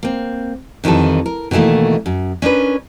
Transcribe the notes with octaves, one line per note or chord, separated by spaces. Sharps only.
A#3 C4
F2 D#3 E3 G3 A4
A#4
B2 D#3 E3 A3 A#3
F#2
C#4 D4 A#4 B4